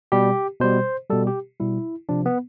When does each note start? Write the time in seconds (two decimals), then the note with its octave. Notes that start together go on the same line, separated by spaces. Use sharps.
0.12 B2 G3 G4
0.60 B2 G3 C5
1.10 B2 G3 A4
1.27 G4
1.60 B2 G3 E4
2.09 C3 F3 D4
2.26 B3